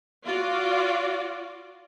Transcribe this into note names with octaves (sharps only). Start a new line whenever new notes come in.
F4 F#4 D5